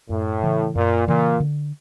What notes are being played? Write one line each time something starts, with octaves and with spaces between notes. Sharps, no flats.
F#2 A2
C#3 E3
F#2 A#2
A#2 C#3 E3
D3